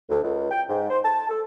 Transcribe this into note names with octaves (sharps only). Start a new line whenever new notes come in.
D2
C#2
G5
G#2
C5
A5
A4